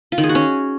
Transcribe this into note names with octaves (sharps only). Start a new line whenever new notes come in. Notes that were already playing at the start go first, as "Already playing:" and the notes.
F4
D#3
G#4
F#4
C#4